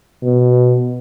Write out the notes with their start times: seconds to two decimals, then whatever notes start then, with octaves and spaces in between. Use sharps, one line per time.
0.22 B2